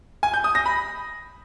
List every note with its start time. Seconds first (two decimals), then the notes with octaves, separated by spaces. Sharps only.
0.23 G#5
0.34 G6
0.44 D#6
0.55 A#6
0.66 B5